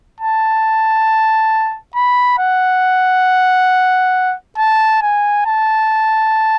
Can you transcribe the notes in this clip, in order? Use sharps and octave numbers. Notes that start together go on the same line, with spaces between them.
A5
B5
F#5
A5
G#5
A5